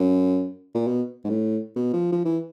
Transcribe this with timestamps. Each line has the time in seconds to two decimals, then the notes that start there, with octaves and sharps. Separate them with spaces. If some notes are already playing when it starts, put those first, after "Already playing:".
Already playing: F#2
0.74 A#2
0.87 B2
1.24 G#2
1.29 A2
1.76 B2
1.93 F3
2.12 F3
2.25 E3